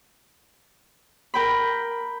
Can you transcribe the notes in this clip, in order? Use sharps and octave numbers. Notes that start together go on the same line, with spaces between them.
A#4 G5 B5